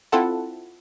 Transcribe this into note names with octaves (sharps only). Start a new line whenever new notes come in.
C4 E4 F4 A4 F#5 A5